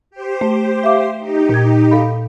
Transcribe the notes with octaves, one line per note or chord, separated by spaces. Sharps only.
G4 C5
A3
E5 F5 D6
D#4 G4
A#2 G#6
A4 F5 B5